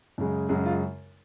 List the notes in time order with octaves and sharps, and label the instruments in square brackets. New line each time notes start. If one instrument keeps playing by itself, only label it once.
[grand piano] F#2 C#3 G#3
F#2 C#3 G#3 G#4
F4